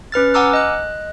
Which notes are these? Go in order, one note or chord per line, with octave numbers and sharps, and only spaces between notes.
C#4 B4 F6 A6
F#5 G#5 A#5 D6 E6 F6
D#5 F#6